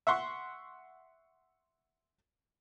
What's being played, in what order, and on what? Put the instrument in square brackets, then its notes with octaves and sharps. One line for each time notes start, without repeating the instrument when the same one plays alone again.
[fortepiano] E5 F#5 C6 C#6